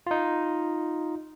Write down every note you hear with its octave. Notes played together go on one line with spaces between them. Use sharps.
D#4 F4